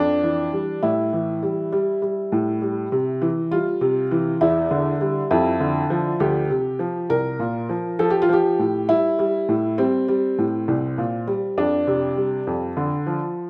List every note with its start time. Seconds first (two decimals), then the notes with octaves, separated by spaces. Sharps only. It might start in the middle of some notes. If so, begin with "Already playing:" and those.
Already playing: F2 D4
0.23 E3
0.53 G3
0.83 A2 E4
1.13 E3
1.43 G3
1.72 G3
2.02 G3
2.32 A2
2.62 G3
2.92 C3
3.22 E3
3.51 G3 F4
3.81 C3
4.11 E3
4.41 E2 E4
4.71 D3
5.01 G3
5.31 F2 E4
5.60 D3
5.90 F3
6.20 D2 G4
6.50 C3
6.79 F3
7.10 C2 A#4
7.39 A#2
7.69 F3
7.99 F3 A4
8.10 G4
8.22 F4
8.29 F3 G4
8.59 A2
8.89 G3 E4
9.19 G3
9.49 A2
9.78 G3 C4
10.08 G3
10.38 A2
10.68 C2
10.98 A#2
11.27 G3
11.57 F2 D4
11.87 C3
12.17 G3
12.47 F2
12.77 D3
13.07 F3